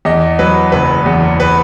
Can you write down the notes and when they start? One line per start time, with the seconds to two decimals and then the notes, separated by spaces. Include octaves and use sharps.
0.05 E2 D#5
0.39 F#3 B4
0.72 F#1 B4
1.06 E2
1.40 B4